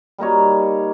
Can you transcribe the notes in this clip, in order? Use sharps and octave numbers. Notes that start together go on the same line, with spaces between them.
G3 A#3 D#4 C#5